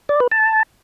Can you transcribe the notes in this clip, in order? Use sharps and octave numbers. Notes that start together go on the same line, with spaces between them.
D5
B4
A5